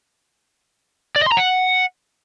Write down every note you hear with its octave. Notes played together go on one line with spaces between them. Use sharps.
D5
D#5
C6
A#5
F#5